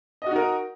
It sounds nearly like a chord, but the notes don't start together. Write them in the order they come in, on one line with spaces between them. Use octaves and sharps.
D#5 F#4 D#4 A#4